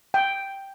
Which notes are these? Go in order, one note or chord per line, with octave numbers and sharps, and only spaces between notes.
G5